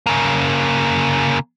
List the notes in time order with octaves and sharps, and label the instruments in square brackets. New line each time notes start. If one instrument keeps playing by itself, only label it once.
[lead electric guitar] C#3 A#3